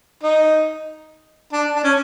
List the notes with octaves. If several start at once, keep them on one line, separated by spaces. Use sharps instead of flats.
D#4
D4
D4
C#4